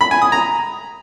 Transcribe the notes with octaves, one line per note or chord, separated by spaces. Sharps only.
B5
G#5
D#6
A#5